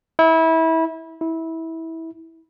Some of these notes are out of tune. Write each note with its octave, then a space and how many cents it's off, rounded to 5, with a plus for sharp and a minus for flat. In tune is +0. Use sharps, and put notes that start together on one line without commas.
E4 -25
E4 -20